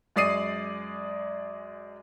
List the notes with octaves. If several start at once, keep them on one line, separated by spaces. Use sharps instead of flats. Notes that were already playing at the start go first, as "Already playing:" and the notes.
F#2 G#3 D5 D#6 C7 D#7